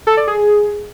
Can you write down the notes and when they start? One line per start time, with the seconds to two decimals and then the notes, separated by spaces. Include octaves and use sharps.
0.07 A4
0.17 D5
0.27 G#4